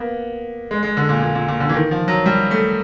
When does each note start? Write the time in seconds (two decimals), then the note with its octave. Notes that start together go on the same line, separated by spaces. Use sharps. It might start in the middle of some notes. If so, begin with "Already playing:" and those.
Already playing: A#3 B3
0.71 G#3
0.83 G#3
0.97 D3
1.09 A#2
1.21 A#2
1.35 A#2
1.48 A#2
1.60 D3
1.69 E3
1.74 D#3
1.91 F3
2.08 F#3
2.26 G3
2.51 A3